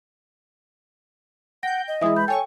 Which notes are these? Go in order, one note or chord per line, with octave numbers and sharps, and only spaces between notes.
F#5 G5 G6 A#6
D#5
E3 G#3 E4 E5 D#6
B5 G6
A4 C#5 G5 G#5 C#6